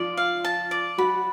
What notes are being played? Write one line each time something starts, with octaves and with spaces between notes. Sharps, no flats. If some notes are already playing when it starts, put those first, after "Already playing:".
Already playing: F3 F4 D5
F5
A5
D5
F#3 F#4 B5